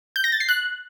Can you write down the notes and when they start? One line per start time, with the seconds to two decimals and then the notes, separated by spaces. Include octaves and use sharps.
0.16 G6
0.24 A#6
0.32 A6
0.40 C7
0.49 F#6